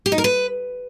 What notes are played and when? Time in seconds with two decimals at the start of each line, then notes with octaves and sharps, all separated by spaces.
0.06 G4
0.12 D#4
0.18 A#4
0.24 B4